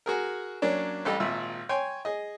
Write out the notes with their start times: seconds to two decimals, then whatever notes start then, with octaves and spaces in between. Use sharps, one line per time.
0.06 F#4 G#4 A#4
0.62 F#3 A#3 C#4 D4 D5
1.05 A1 G3 A4 D#5
1.20 G#1 A#2 E5 E6
1.69 C#5 G5 G#5 C6
2.05 G#4 D#5